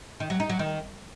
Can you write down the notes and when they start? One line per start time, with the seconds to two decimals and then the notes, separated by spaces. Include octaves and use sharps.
0.20 D#3
0.30 F#3
0.40 D#4
0.50 F#3
0.59 D#3